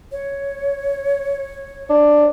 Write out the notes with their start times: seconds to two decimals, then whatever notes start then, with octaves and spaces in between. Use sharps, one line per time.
0.12 C#5
1.89 D4